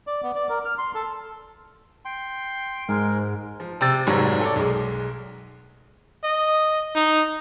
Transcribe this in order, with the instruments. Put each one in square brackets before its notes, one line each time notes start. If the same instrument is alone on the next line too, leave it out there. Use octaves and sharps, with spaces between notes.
[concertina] D5
B3
D5
A#4
F6
C6
A4
[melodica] G5 C6
[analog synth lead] G#2 [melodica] G#3 A#4
[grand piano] F3
C3 G5 E6 A6
F1 F2 G#2 F#3 G3 C#5
A4 C#5 D5
B1 G#3
[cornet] D#5
D#4